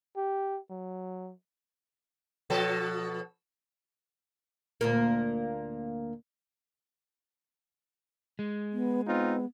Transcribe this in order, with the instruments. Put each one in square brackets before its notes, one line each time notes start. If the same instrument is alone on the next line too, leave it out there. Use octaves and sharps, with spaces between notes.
[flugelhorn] G4
F#3
[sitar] B2 F3 A4
[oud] D2 A#2 A#3
[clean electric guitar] G#3
[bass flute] B3
[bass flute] B3 [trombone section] C4 D#4 F4